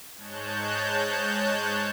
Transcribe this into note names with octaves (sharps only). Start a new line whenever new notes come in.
G#2 G#3 C#5 A5 F#6 G6